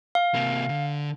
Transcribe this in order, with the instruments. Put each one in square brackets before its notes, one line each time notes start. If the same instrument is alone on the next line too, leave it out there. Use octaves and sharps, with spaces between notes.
[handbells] F5
[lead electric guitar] C3 A#3
D3